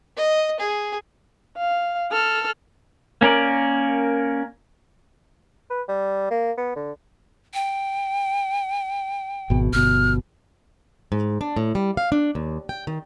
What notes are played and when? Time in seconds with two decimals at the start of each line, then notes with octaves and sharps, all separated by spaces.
0.17 D#5
0.60 G#4
1.58 F5
2.12 A4 F6
3.21 A#3 C#4 A#4 D5
5.70 B4
5.88 G3
6.30 A#3
6.57 B3
6.76 D3
7.54 G5
9.50 G#1 B2
9.73 G1 B2 F6
11.12 G#2
11.41 D4
11.57 A2
11.75 G3
11.97 F5
12.12 D4
12.35 D#2
12.69 G5
12.87 D#3